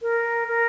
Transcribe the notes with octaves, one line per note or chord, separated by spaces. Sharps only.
A#4
A#4